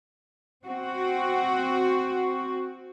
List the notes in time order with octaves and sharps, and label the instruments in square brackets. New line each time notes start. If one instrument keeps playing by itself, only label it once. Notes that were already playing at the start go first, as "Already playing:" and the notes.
[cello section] C4 F#4